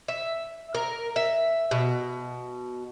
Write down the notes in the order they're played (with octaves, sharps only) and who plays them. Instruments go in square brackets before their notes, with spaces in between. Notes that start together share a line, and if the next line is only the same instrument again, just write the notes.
[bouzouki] E5
A#4
E5
B2